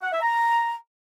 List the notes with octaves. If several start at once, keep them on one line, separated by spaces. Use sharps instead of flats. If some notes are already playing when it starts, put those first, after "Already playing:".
F#5
E5
A#5